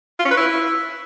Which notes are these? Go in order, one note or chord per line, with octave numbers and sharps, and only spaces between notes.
F4
C#4
B4
E4